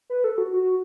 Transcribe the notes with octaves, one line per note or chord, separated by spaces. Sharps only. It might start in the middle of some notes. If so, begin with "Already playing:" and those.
B4
A4
F#4
F#4